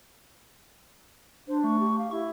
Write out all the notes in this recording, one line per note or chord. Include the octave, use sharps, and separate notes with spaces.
D4 C5
A3 C#6
G4
F5
E4 C#6